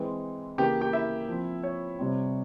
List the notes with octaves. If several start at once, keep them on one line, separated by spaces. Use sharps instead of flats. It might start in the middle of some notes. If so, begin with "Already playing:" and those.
Already playing: E3 G#3 C4
C#3 E3 A#3 G4 G5
G4 G5
E4 E5
F3 C4
C#5
C3 G3 C4